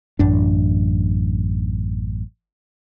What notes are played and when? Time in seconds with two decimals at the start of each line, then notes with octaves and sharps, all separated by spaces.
0.19 A1 F#2 D4